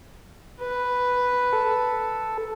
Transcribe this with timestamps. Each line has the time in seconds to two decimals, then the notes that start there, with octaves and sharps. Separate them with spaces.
0.61 B4
1.53 A4